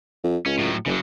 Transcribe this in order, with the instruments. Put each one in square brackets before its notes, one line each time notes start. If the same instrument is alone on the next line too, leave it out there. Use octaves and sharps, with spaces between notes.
[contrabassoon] F2
[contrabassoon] C#2 [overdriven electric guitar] C#4
[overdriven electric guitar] A2 F#3
[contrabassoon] F#1 [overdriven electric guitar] C#3 F#3